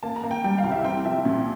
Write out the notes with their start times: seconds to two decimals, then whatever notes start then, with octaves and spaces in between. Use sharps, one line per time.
0.03 A#3 A5
0.16 A#5
0.23 A#3
0.31 G5
0.44 G3 G5
0.58 F5
0.64 C2
0.72 E5
0.84 C4 G5
1.05 F3 E5
1.25 A#2